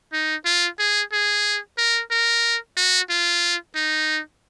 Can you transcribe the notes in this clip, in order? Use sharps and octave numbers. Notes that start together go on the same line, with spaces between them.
D#4
F4
G#4
G#4
A#4
A#4
F#4
F4
D#4